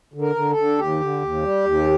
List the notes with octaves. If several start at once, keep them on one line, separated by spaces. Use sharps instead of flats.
D3
A#4
D3
A4
D3
D#2 G4
D3
D#2
G3
D#2